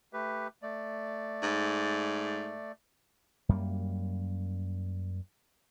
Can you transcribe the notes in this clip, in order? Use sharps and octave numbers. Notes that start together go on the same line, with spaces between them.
A3 G4 B4
A3 D5
G#2
F#2 G3 A#3